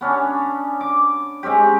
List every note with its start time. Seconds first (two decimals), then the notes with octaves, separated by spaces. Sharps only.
0.01 B3 C#4 D4
0.81 D6
1.43 G#3 C4 C#4 G4